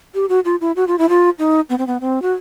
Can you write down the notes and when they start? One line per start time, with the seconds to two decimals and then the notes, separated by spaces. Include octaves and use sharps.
0.15 G4
0.29 F#4
0.45 F4
0.61 E4
0.76 F#4
0.87 F4
0.98 E4
1.09 F4
1.39 D#4
1.70 B3
1.78 C4
1.87 B3
2.01 C4
2.22 F#4